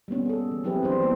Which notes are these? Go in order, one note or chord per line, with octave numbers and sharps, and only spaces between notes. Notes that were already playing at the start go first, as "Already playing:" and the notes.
G3 A#3 B3 C#4
G#4 A4
E3
F#3 C4 E4 G4 G#4 B4
E3 D4 C5
G3 A#3 B3 G4